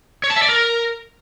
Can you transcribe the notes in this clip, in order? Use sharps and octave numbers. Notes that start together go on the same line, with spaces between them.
C#5
A5
E5
D5
A#4